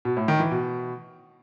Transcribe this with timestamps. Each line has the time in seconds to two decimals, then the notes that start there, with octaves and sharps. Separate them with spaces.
0.05 B2
0.17 A2
0.28 D#3
0.40 E3
0.51 B2